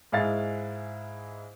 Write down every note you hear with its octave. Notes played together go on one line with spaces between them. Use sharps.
G#2 G#3 E4 F5 A6